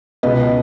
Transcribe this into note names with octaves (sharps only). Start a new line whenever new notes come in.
C#2 B2 B4 D#5